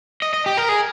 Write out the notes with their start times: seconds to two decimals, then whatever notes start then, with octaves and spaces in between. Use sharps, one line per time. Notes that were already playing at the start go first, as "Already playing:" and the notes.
0.22 D#5
0.34 D#5
0.46 G4
0.57 A#4
0.69 G#4